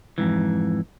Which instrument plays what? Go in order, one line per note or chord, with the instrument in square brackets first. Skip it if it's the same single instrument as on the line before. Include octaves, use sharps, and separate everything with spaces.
[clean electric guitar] F2 G#2 E3